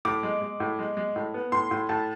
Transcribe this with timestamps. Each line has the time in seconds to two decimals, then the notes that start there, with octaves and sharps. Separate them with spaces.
0.05 A2 D6
0.23 G#3
0.42 G#3
0.60 A2
0.79 G#3
0.97 G#3
1.16 A2
1.34 B3
1.52 A2 C6
1.71 A2
1.89 A2 A5